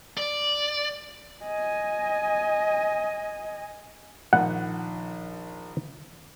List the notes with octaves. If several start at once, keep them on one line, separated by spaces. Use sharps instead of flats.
D5
D#5 G#5
A#1 D#3 F#5